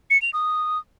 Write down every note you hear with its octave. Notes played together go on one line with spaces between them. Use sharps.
C#7
F7
D#6